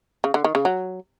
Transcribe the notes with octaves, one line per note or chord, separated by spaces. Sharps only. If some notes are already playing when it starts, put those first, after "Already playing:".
C#3
D3
D#3
C#3
F#3